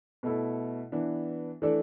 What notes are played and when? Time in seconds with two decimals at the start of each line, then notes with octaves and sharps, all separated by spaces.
0.23 B2 A3 E4 A4
0.92 E3 B3 D4
1.62 E3 A3 D4 A4 D5